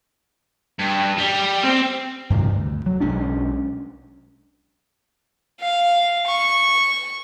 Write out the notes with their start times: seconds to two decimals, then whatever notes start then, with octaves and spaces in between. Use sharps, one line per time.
0.79 G2
1.17 G3
1.64 C4
2.30 G2 C3 D#3 F3
2.51 D2
2.86 F#3
3.00 B1 G#3 C#4 D4
5.61 F5
6.26 C#6